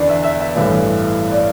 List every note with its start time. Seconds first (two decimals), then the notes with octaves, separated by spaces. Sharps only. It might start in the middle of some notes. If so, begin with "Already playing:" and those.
Already playing: E2 D3 B3 D4 D5
0.09 E5
0.24 E5
0.40 E5
0.56 A1 G2 E3 A3
1.32 D5